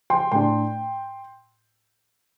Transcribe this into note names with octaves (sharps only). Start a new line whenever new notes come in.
G5 C6
A2 A3 D4 G5 C6